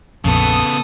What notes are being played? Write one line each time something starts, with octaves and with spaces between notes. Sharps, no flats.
A#1 F2 C#3 B3 A4 D#6